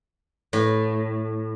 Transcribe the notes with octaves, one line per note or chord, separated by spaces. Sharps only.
A2